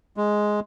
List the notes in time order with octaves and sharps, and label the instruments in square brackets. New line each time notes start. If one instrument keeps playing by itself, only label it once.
[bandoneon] G#3